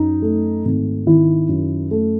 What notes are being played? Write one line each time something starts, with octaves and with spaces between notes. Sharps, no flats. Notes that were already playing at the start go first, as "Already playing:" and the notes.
Already playing: F#2 D#4
A3
G#1
D#3 E4
F#2
A3